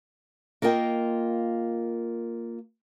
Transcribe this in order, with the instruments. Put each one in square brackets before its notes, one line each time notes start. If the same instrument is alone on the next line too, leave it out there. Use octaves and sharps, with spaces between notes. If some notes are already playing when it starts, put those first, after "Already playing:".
[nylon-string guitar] A#3 F4 A#4 D#5 F#5 G5